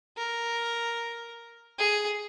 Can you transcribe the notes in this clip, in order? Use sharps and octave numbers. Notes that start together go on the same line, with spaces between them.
A#4
G#4